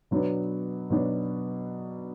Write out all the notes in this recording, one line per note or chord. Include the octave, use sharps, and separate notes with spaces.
B2 F#3 B3 D4
B2 F#3 B3 D4